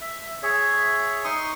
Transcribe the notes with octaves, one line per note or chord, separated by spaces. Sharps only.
E5
G#4 C#5 E5
D#4 C6 C#6 D#6